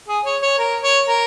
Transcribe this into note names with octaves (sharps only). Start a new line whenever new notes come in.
G#4
C#5
C#5
A#4
C#5
A#4